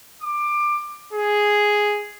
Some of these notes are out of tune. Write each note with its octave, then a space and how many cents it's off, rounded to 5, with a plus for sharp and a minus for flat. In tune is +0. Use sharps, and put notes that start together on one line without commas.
D6 +20
G#4 +0